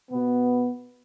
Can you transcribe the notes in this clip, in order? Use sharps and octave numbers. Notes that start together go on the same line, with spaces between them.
B2 B3